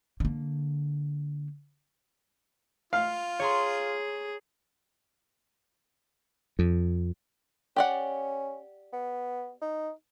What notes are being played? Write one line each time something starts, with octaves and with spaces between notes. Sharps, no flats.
D3 A#3
F4 F5
G#4 C#5 A#5 C6
F2
C#4 G4 D5 F#5
B3
D#4